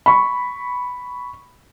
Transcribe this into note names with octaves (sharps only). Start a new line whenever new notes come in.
B5 C#6